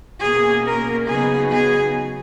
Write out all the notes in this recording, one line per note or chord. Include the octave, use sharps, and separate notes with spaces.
B2 A#3 C#4 G#4
A#4
C#3 F#3 B3 D#4 G#4
G#4